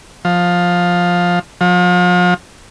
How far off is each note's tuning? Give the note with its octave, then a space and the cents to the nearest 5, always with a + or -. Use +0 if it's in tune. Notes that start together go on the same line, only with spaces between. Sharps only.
F3 +15
F3 +40